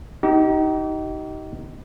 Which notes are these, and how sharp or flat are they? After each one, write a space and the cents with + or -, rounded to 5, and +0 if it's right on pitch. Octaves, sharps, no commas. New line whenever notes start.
D#4 +15 G4 -40